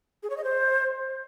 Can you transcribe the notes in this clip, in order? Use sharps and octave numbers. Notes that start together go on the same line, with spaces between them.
G#4
C#5
D#5
C5